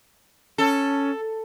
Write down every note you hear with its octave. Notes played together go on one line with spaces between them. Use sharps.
C#4 A4